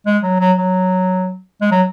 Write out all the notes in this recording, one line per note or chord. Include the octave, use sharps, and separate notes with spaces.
G#3
F#3
F#3
F#3
G#3
F#3